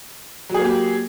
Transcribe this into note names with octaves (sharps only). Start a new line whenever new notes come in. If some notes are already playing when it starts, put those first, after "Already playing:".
F#3 A#3 G4 G#4